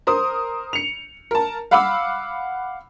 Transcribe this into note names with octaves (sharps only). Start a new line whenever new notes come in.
A#4 C5 D#6
C#7 F7
A#4 A5
F5 F#5 B5 D6 E6